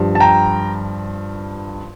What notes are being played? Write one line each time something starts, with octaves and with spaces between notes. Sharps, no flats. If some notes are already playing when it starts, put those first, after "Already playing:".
Already playing: G2 F3
A5
G5 A#5